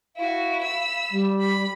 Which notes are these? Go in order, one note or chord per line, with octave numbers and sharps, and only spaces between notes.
E4 F#4 F5
B5 E6
G3
B5